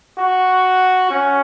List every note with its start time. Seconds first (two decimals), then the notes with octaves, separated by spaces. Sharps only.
0.18 F#4
1.10 C#4